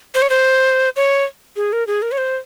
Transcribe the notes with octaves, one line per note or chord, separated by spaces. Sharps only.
C5
C#5
C5
C#5
G#4
A#4
G#4
A#4
C#5
C5